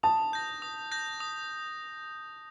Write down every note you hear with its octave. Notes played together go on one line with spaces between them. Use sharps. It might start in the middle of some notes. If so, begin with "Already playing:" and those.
A5 D#6
G6 A#6
D#6
G6 A#6
D#6